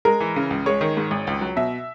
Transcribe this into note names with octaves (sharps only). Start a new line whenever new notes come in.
G#3 A#4
E3
C#3
C#2
G#3 C#5
D#3
G#2
G#1
C#2
F#3
B2 E5